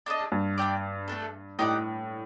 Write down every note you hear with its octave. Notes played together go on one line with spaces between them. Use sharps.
D4 A4 D#5
G2
D4 G4 D5
A3 D4 A4
A2 D#4 G4 D5 F#5